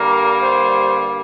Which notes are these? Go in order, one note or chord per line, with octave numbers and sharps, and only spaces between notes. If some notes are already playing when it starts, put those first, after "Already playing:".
Already playing: G2 D3 G3 A#3 A#4
C5